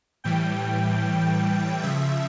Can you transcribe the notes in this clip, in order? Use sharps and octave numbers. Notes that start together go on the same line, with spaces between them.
A2 E3 G3 G5
C#3 F3 E5